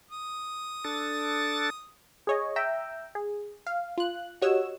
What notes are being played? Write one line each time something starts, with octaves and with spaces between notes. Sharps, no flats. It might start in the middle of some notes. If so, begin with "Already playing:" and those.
D#6
D4 A4 A6
G#4 C#5 D#5
E5 G5 A#5 E6
G#4
F5
F4 F#6
F#4 G4 C#5 D#5 F#5 E6